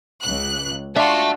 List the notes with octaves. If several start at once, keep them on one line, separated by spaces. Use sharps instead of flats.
C#2 F#6
D4 F4 F#4 E5 A5